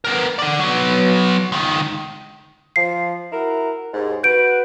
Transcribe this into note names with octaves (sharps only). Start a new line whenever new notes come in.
B3 A#4
D5 F#5
F#3 B3
C#2 D#3
F3 C7
E4 F#4 A#4
D#2 G#2
F#4 B4 G6 D7